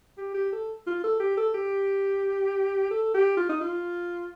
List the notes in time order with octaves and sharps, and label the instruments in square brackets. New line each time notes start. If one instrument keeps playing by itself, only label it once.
[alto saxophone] G4
G4
A4
F4
A4
G4
A4
G4
A4
G4
F4
D#4
F4